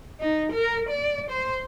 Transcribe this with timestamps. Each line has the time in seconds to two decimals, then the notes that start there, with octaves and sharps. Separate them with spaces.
0.20 D#4
0.53 A#4
0.90 D5
1.31 C5